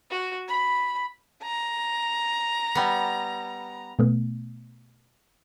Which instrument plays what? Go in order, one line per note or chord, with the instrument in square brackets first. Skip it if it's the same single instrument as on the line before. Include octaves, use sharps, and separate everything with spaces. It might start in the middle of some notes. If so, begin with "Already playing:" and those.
[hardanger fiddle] F#4
B5
[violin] A#5
[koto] G3 B3
[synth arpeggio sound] B2 A3 B3